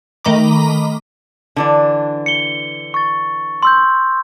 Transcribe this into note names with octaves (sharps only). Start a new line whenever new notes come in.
D#3 A3 D#5 A#5 B5 D6
D3 E3 D4
C#7 G7
C#6 A6
C6 E6 G6